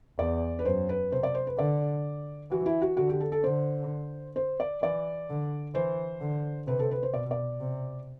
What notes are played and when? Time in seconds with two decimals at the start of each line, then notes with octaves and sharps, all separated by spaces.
0.19 E2 D5
0.59 B4
0.65 F#2 C5
0.89 B4
1.12 C3 C5
1.23 D5
1.35 C5
1.47 B4
1.58 D3 D5
2.51 E3 F#4
2.66 E4
2.82 F#4
2.97 D3 F#4
3.09 G4
3.20 A4
3.32 A4
3.43 D3 C5
4.36 C5
4.60 D5
4.82 E3 D5
5.29 D3
5.74 E3 C5
6.21 D3
6.67 C3 B4
6.79 A4
6.91 B4
7.03 C5
7.14 B2 D5
7.31 D5
7.60 C3